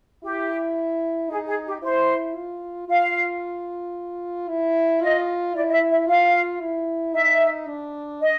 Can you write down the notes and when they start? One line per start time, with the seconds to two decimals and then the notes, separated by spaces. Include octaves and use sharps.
0.23 E4 G4
1.29 D#4 G#4
1.47 G#4
1.65 G4
1.82 E4 C5
2.36 F4
2.89 F4 F5
4.48 E4
5.01 F4 D#5
5.54 E4 D5
5.68 D#5
5.72 E5
5.90 E5
6.07 F4 F5
6.60 E4
7.13 D#4 E5
7.67 D4
8.20 D#5